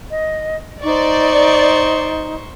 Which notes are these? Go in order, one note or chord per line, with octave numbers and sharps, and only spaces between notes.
D#5
D#4 C5 D5 C#6